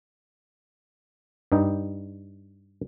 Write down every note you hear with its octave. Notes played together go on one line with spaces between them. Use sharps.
G2 G3 D#4 G5